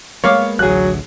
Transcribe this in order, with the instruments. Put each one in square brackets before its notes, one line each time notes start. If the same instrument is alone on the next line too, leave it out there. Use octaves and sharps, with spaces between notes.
[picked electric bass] G#3 A#3 B3 [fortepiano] C#5 F5 D6
[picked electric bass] A1 D2 [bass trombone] F#3 [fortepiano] G#4 F#6